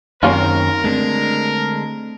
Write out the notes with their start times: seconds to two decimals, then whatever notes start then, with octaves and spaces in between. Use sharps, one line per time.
0.23 F#2 D#3 A#3 C4 C#4 F4 A#4
0.84 D3 G#3 A3 C4 D4